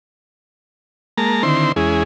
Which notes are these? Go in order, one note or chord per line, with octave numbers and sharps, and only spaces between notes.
G#3 A#3 A5 A#5
D3 D#3 C4 E4 C5 C6
E2 G#3 C#4 E4 G#4